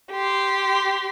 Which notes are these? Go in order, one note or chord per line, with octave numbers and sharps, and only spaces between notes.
G4 C6